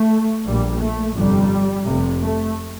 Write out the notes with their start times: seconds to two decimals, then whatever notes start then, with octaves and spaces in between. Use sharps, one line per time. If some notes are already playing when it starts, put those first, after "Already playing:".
Already playing: A3
0.47 A#1 A#2 G3
0.81 A3
1.16 G1 F2 C3 G3
1.86 F1 F2 C3
2.22 A3